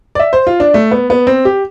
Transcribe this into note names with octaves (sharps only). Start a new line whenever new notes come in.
D5
E5
C5
F4
D4
A3
B3
B3
C4
G4